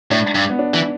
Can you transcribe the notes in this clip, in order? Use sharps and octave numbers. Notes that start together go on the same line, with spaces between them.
A2 D4
G2
B3
D4
E3